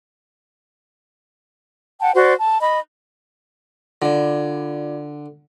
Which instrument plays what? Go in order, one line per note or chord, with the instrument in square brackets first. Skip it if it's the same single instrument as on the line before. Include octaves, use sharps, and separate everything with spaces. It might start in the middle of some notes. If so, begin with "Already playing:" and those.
[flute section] F#5 G5 A5
F#4 C5 D5 F#5
A5
D#5 B5
[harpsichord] D3 [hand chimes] F4 D5